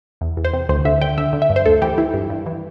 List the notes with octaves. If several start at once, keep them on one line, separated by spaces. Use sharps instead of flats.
E2
E2
C5
C3
D2 C5
D3 E5
D3 G5
D3 E5
D3
E5
G2
C5
D2 A4
E3 G4
E3 E4
G2
G2
E3